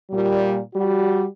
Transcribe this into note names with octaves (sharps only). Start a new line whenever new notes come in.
A#2 G3
G3 F#4